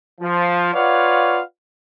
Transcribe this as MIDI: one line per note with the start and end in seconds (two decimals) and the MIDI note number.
0.21 0.71 53
0.74 1.40 65
0.74 1.40 71
0.74 1.40 73
0.74 1.40 74
0.74 1.40 77
0.74 1.40 78